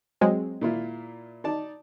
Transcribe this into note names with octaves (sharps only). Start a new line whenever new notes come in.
F#3 G#3 C4
A#2 E4 F4
D#4 D5 A5